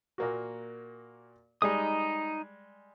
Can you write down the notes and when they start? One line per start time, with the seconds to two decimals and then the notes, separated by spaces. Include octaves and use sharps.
0.18 A#2 A#3 F#4
1.62 G3 G#3 D#4 D#5 D#6